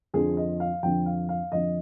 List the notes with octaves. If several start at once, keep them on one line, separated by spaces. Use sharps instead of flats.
F2 D3 F3 G#4
D#5
F5
F2 D3 F3 G5
F5
F5
F2 D3 F3 D#5